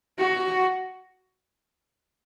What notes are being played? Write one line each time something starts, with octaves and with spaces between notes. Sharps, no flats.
F#4